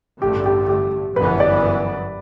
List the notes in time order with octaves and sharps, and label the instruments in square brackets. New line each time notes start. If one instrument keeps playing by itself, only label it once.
[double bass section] A1 G2 D3 A3 [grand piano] G4
[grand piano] G4
G4
[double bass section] G1 F#2 E3 B3 [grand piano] B4
[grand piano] D5